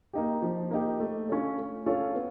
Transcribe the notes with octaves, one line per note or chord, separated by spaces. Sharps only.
A#3 D#4 G4
F3
A#3 D#4 G4
A3
C#4 F4 A4 C#5
A3
C#4 F4 A4 C#5
B3